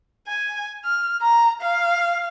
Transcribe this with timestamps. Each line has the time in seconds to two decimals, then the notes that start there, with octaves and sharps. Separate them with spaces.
0.28 G#5
0.84 F6
1.22 A#5
1.62 F5